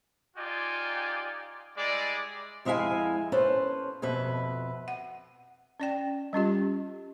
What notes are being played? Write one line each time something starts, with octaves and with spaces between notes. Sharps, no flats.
D#4 F4 G4 D5 G#5
G3 G#3 E4 D5
F2 G#3 E4 E5 F5 G#5
C#4 A4 B4 C5
F2 B2 B4 E5
F#5
C#4 D5 G5
G3 C#4 F4 G4